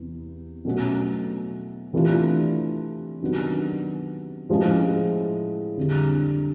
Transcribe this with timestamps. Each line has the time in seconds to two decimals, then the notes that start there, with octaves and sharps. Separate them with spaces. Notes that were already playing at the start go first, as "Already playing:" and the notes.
Already playing: E2 C3
0.65 B2 F#3 A3 C#4 F#4
1.93 C3 E3 A3 D4 F4
3.21 C3 D#3 F#3 B3 D4
4.49 A2 F3 G#3 C#4
5.77 F2 D3 G3